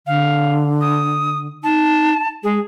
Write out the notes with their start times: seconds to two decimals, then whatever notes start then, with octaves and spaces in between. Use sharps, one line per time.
0.07 D3 F5
0.81 D#6
1.64 D#4 A5
2.44 G#3 G#4